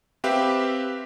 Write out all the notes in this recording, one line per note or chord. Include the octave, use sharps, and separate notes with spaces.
C4 G4 B4 E5 F5